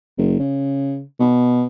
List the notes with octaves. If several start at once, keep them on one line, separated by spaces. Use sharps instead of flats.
F#1
C#3
B2